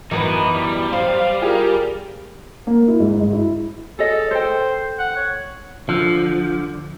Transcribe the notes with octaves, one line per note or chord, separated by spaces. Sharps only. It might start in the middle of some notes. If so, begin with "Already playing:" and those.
F#2 D#3 E3 B3 D#4 B4
G3
C5 F5
F4 G4 G#4 A#4
A#3
E4
G#2
G#2
E4
G#4 A4 C#5 D#5
A4 C5 G5
F#5
C#5
D3 F3